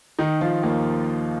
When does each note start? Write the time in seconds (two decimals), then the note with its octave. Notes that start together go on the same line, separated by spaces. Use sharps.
0.19 D#3 D#4
0.41 D#3 F3 F4
0.63 D#2 A#3